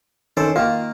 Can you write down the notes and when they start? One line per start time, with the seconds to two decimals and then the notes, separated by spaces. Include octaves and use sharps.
0.37 D#3 C#4 A4 C5 D5
0.56 D#3 A#3 F4